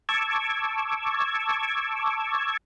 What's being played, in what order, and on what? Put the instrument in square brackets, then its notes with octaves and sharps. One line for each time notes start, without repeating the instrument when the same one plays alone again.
[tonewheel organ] A5 C#6 D6 E6 G#6